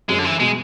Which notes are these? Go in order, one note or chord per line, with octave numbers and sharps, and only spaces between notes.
F#2 G#3
D3
E3
B2 G#3